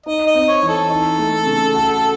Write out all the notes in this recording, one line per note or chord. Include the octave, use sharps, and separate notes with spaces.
D#4 D#5
D#5
C4
C#5
E3
A4
D#4
A3
C#3
F#4